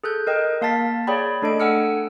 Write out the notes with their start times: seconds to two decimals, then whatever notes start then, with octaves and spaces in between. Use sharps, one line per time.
0.04 G#4 A4 F#6 G6
0.27 A#4 D#5 G5
0.61 A#3 F5 A5 A6 B6
1.07 G#4 C#5 D5 G5 B5
1.42 A3 D4 A4 D#5 D7
1.60 A4 F#5 G#5 E6 F6 C#7